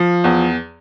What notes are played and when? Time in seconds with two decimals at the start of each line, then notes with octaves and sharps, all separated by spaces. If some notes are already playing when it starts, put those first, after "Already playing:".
Already playing: F3
0.24 E2